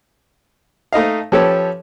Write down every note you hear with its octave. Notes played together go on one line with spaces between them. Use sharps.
A3 D#4 D#5 F5
F3 C#4 G4 A4 B4 C#5